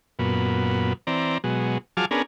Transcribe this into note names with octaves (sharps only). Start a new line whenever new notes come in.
F#2 A#2 B3
E3 C4 D5 A#5
B2 F#3 G#3
F3 F#3 G#4 A5 D6 F6
B3 C#4 D4 G#4 A#4